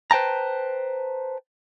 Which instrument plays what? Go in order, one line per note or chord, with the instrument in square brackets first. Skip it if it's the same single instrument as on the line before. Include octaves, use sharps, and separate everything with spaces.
[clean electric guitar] B4 C5 G5 A5 A#5